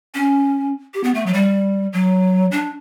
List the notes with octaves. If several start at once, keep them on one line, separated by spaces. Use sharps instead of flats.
C#4
G4
B3
A3
F#3
G3
F#3
D4